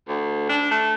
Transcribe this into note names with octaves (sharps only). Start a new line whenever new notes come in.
D2
D4
A3